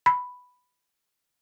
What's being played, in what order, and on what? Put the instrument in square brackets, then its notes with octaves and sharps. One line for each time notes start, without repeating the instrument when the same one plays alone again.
[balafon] B5